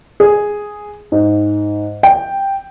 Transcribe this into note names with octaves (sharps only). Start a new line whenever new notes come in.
G#4
G#2
G5